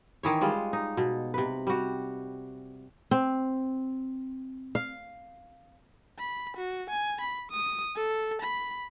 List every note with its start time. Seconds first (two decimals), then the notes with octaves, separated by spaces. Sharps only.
0.23 D#3 E3 C#5
0.41 G3 G#3 F4
0.73 D#4
0.97 B2
1.34 C3 B4
1.67 G3 F#4
3.11 C4
4.75 F5
6.19 B5
6.57 F#4
6.90 G#5
7.21 B5
7.51 D#6
7.96 A4
8.42 B5